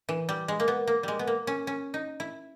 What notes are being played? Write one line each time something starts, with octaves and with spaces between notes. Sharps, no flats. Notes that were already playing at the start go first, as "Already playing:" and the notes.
E3
G3
G#3
A#3
B3
A#3
G3 G#3
B3
A#3
C#4
C#4
D#4
E4